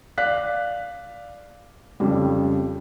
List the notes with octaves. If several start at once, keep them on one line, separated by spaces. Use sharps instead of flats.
D5 F5 F#6 B6
F2 C#3 G3